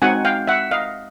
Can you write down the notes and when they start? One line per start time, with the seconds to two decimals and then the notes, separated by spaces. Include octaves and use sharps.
0.02 G#3 C4 D#4 F#4 F#5 G#5
0.25 F5 G5
0.47 E5 F#5
0.71 D#5 F5